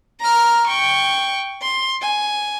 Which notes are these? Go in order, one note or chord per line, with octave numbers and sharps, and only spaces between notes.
A#5 F6
G5 C#6
C6
G#5